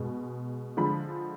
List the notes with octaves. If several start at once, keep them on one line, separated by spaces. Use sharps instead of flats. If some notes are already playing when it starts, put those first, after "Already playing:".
Already playing: B2 G#3
D3 F3 G#3 B5